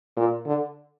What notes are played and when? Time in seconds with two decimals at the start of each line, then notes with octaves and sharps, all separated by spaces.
0.17 A#2
0.46 D3